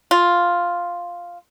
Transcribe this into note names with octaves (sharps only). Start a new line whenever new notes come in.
F4